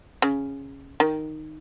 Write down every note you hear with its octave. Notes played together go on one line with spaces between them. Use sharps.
C#3
D#3